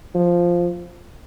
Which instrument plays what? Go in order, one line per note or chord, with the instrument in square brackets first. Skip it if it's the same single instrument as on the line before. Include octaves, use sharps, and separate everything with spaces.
[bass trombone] F3